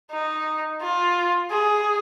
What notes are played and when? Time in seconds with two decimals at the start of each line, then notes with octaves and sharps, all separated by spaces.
0.12 D#4
0.82 F4
1.51 G#4